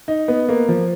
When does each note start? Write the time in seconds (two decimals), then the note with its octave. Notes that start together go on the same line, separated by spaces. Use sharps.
0.08 D#4
0.28 B3
0.49 A#3
0.69 F3